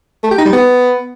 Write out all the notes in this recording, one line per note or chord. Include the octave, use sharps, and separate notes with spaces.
A3
G4
D#4
G3
B3